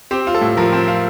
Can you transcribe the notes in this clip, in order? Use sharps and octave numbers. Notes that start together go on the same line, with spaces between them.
C4 G4
F4
A4
A2
F3 A#4
C4
F4